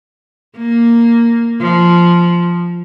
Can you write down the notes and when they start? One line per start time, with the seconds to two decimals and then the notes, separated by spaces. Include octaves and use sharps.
0.58 A#3
1.60 F3